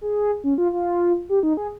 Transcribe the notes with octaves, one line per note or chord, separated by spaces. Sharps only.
G#4
C#4
F4
F4
G4
D#4
G#4